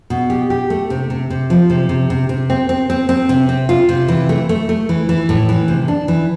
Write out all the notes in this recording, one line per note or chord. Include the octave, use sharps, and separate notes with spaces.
B2
G4
G4
A3
C3
C3
C3
F3
C3
C3
C3
C3
C4
C4
C4
C4
C3
C4
F4
C3
E3
A3
A3
A3
E3
E3
A2
E3
C3
D4
E3